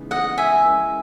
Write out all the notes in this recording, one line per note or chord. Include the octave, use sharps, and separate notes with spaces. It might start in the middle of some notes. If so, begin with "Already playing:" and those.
Already playing: C#3 E3 G#3 B3 D#4
D#5 F#5
E5 G#5
G#3 C#4 E4 A#4